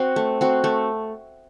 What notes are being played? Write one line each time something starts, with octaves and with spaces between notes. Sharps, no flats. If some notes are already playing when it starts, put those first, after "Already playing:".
Already playing: C4 F#4
A3
C4 F#4
A3